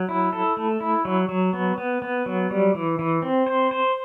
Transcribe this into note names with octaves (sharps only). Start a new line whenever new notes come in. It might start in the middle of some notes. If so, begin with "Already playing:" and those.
Already playing: F#3
E4
A4
A3
E4
F#3
F#3
B3
B3
B3
F#3
G3
E3
E3
C4
C5
C5